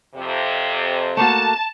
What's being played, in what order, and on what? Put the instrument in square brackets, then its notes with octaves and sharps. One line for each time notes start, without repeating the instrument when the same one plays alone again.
[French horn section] F2 C3
[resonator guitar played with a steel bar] A3 A#3 F#4 [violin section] A5